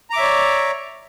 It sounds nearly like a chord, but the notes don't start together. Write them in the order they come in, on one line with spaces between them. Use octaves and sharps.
A#5 D6 E5 C#5 D5